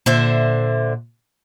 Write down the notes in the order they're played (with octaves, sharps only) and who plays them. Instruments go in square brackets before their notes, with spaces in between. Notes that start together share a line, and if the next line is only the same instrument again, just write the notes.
[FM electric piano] A#2 [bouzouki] D3 C5 E5